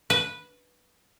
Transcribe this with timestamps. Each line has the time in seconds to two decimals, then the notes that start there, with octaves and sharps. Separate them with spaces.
0.10 B4